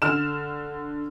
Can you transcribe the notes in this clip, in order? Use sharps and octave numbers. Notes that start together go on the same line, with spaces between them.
D3 F6 E7